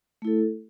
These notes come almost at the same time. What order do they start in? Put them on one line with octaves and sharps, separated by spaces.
A3 E4 A4